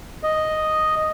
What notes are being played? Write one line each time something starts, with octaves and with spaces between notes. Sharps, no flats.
D#5